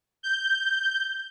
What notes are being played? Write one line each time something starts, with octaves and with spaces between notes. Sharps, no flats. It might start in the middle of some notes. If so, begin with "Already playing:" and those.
G6